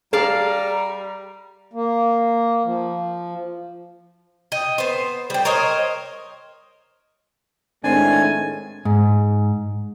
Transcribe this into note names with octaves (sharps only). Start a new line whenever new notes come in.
G3 G#4 D5 F5 A5 A#5
A#3
F3
D#5 G5
B3 C5
G3 G5
A#4 C5 C#5 D#5
A2 D#3 G#3 C4 D4 G#5
G#2